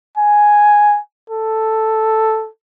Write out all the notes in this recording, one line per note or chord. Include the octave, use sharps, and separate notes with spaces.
G#5
A4